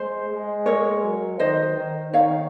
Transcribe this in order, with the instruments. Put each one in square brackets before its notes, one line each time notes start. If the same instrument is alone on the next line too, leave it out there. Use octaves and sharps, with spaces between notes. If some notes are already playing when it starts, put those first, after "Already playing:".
Already playing: [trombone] G#3 [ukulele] C5
[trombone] G#3
[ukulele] A#4 C#5
[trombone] F#3
[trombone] D#3 [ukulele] C5 D#5
[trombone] D#3
[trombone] D#3 [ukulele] C#5 F5